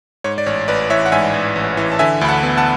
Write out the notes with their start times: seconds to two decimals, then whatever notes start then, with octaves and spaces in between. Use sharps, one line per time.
0.24 G#2 C#5
0.38 D5
0.46 A1 C#5
0.68 A1 B4 D5
0.90 E3 C#5 E5
1.06 F#5
1.12 G#2 E5 G#5
1.34 A1
1.56 A1
1.77 E3
1.92 A5
1.99 D3 E5 G#5
2.21 D2 B5
2.28 F#5 A5
2.43 B3
2.57 F#5 A5